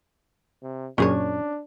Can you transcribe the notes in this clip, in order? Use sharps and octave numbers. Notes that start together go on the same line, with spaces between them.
C3
F#2 A#2 C#4 D4 G#4 C#5